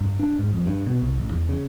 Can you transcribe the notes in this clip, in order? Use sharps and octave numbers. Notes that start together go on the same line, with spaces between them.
G2
D4
G#2
F2
G2
B2
C2
A1
E2
C#3